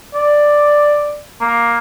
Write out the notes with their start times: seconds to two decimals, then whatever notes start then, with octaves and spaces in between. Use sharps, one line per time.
0.14 D5
1.41 A#3